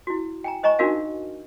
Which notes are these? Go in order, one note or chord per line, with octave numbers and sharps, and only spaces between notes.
E4 F#4
G5 G#5 A#5
C5 D#5 G#5 A#5 C#6
D4 D#4 F#4 A#4 F5 G#5